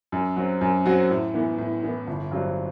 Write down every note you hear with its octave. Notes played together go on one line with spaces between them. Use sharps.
F#2
F#3 C4 F#4
F#2
F#3 C4 F#4
A2
E3 B3
A2
E3 B3
G1
G2 F#3 C4